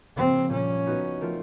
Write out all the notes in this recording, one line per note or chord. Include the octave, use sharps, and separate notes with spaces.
C#3 F3 A#3 C4 D4 F#4
A#2 G3 A#3 C#4
B3 D#4 F#4 B4 D#5
F3 A3 C4 F4 A#4